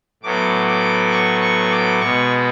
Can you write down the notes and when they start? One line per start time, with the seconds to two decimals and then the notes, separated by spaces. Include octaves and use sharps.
0.23 A2 F#3 B3 D6
0.67 D6
1.12 C#6
1.41 C#6
1.71 D6
2.01 B2 G#3 B3 C#6